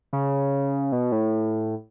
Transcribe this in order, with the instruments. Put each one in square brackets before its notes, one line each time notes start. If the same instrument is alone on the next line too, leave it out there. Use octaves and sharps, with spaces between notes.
[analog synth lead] C#3
B2
A2